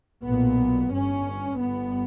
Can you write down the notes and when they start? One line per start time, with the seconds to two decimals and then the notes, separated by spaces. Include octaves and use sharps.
0.24 B1 A#2 B3
0.91 G1 G2 C#4
1.59 G1 G2 B3